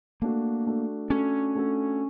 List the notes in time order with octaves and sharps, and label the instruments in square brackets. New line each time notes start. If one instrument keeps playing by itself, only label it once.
[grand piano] A3 D4 F#4 A4 [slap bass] A#3
[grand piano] A3 D4 F#4 A4
[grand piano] A3 D4 F#4 A4 [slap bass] C#4
[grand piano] A3 D4 F#4 A4